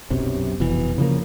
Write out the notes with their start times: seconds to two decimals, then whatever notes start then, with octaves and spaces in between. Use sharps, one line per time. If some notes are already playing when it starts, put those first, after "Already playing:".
0.10 B1 F#2 C3
0.60 F1 B2 E3
0.98 C#3 F3 A#3